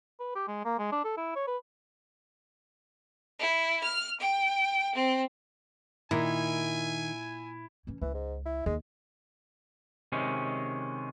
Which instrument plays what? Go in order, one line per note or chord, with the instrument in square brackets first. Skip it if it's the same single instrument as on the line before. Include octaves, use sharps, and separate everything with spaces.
[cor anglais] B4
G4
G#3
A#3
G#3
D4
A4
E4
C#5
B4
[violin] E4
F6
G5
C4
[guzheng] A#2 [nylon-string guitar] D#3 [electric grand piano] E4 [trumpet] G#5
[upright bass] E3 C#4
[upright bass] C#2 [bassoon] E3
[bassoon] G#2
E4
[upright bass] D#2 [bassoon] G#3
[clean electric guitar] C3 D#3 G#3 C#4